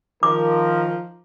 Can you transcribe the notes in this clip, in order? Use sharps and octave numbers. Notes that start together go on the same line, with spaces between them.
D#3 F3 A#4 D6